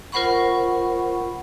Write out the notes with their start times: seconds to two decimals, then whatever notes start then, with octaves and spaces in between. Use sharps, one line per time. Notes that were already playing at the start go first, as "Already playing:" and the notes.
0.12 F4 A#4 C5 F#5 B5 C#6